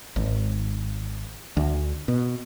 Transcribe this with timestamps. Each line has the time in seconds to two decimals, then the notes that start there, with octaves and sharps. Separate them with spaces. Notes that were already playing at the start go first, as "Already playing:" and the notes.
0.16 G#1
1.57 D2
2.08 B2